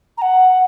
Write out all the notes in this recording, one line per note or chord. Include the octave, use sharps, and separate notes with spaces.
A#5
F#5